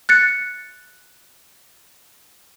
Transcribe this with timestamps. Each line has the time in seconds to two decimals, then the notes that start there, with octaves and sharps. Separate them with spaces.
0.09 F#6 A6 C#7